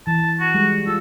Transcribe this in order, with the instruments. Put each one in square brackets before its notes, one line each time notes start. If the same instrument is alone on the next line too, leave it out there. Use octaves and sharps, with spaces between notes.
[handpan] E3 [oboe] A5
[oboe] F#4
[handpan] G3 G#3
[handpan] F4 [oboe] A4